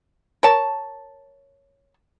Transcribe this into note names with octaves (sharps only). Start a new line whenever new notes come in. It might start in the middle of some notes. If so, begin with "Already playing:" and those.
A#4 C#5 A5